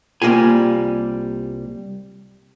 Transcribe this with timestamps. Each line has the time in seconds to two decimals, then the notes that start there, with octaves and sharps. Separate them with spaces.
0.22 C2 G3 A#3 F4 G4 G#5